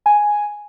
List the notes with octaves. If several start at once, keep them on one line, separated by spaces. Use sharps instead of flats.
G#5